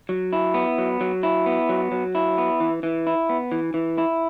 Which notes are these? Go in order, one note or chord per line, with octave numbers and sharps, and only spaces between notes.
F#3
E4
B3
F#3
F#3
E4
B3
F#3
F#3
E4
B3
E3
E3
E4
B3
E3
E3
E4